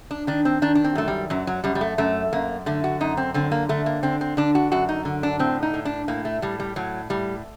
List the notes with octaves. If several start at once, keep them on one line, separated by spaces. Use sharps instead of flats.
D4
D#3 D4
C4
D#3 D4
D4
C4
F#2 A3
G3
F#2 F#3
F#3
F#2 G3
G3
A3
F#2 A3
F#2 A#3
D3 A3
F#4
F#2 D#4
C4
D3 C4
A#3
D3 A3
A#3
D3 C4
C4
D3 D4
F#4
F#2 F#4
D#4
D3
D4
A2 C4
D#4
A2
D4
A2 A#3
A3
A2 G3
G3
A2 F#3
A2 G3